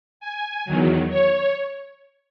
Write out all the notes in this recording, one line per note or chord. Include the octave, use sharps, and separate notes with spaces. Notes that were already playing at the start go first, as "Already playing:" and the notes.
G#5
E2 D#3 F#3
C#5